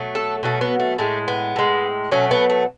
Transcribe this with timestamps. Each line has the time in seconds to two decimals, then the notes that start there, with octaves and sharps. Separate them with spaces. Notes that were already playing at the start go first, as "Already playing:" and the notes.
Already playing: B2 F#3 A3
0.15 A4
0.43 B2 F#3 A3
0.61 B3
0.80 A3
0.98 A2 G#3 A3
1.28 B3
1.56 A2 G#3
2.11 B2 F#3 A3 C#4
2.31 B3
2.50 A3